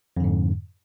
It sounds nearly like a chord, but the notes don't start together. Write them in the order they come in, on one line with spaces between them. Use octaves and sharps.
F2 D3 G#2